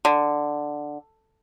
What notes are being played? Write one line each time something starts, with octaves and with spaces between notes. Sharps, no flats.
D3